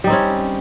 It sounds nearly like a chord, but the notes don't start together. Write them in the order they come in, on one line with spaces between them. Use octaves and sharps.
G3 D#4 C4 C#4